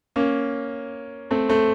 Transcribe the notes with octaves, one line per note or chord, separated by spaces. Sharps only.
A#3 C#4
A3 C4
A3 C4